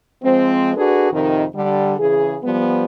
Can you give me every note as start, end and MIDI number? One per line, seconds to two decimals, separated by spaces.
0.22 0.71 53
0.22 0.71 56
0.22 0.71 60
0.75 1.09 62
0.75 1.09 66
0.75 1.09 68
0.75 1.09 69
0.75 1.09 71
1.11 1.44 41
1.11 1.44 48
1.11 1.44 51
1.54 1.93 50
1.54 1.93 55
1.98 2.36 49
1.98 2.36 52
1.98 2.36 68
2.43 2.84 53
2.43 2.84 55
2.43 2.84 59